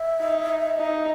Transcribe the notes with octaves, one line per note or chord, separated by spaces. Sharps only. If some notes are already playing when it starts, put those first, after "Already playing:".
Already playing: E5
D#4
D#4